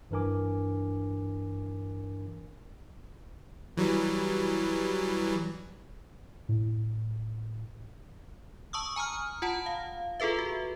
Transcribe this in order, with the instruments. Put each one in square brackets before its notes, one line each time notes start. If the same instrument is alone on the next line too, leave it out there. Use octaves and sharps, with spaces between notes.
[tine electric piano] G2 E3 D4 A#4 G#5 D6
[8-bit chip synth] E3 F#3 G3
[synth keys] A2
[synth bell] A5 C#6 D#6 E6
G#5 A#5 D#6 F6
F4 F#5 A5 B5
F5
F4 G#4 A4 B4 E5
F#4